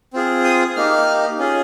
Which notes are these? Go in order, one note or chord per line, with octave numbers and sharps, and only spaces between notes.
C4 F4 G#4
D#6
A#3 D#4 G4 F6
C#4 F4 G#4